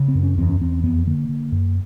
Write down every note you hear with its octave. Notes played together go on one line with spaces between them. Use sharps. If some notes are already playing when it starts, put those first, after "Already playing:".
Already playing: C#3
C4
F#2
C#4
E2 C4
C#4
E2 C4
F2 B3
D3 A#3
D3
F#2